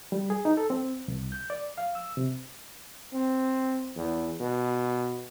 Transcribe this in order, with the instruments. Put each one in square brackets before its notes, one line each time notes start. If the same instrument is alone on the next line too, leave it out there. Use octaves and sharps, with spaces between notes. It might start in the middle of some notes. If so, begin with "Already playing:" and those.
[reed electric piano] G3
G#4
D#4
A4
C4
C2
G6
D5
F5
E6
C3
[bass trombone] C4
E2
B2